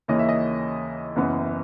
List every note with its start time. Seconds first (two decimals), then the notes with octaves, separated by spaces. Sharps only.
0.08 D#2 C#3 E3 A#3 C#4 D#5
0.19 E5
0.29 D#5
1.16 F#1 F#2 E3 B3